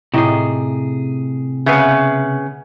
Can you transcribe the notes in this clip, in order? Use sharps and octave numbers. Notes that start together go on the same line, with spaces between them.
A2 C3 D#4 G4 G#4
C#3 B3 E5